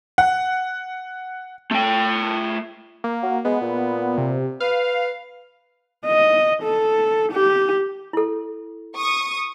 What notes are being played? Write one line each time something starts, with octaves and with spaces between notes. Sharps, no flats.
F#5
A3 G5
A#3
F#4
G#3 B3
A#2
C3
B4 F5
D#5
A4
G4
E4 A4
C#6 D#6